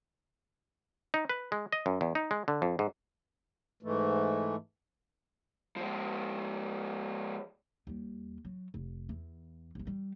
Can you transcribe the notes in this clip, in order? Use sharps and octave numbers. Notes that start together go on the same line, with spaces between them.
D#4
B4
G#3
D#5
F#2
E2
D#4
G#3
D3
F2
G#2
G#2 E3 A3
F3 G#3
D#2 G3
F#3
F1
E2
G1 G#3
G3